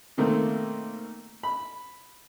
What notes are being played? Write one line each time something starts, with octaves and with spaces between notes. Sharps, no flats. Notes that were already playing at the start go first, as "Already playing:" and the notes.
B2 D#3 A3 A#3 C4
B5